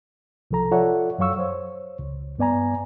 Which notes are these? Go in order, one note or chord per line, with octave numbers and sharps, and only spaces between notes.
C2 F3 A4 A#5
F4 A4 C#5 D5 E5 F#5
F#2 F#3 C#5 F5 C#6 E6
C5 C#5
C#2
G2 B3 D5 G#5 A#5